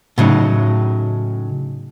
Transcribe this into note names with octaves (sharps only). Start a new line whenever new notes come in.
A2 C#3 F#3 D#4